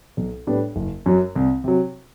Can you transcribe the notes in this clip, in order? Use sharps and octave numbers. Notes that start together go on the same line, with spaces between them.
B1
A2 G3 B3 D4
F#1
F#2 F#3
C2
C3 F#3